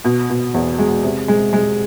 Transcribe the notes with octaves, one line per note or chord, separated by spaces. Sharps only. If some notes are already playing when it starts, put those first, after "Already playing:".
B2
B2
E2
G#3
C3
G#3
G#3